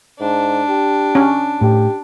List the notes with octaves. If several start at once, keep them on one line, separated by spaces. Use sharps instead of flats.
G#2 D4
G4
C#4
A2 G4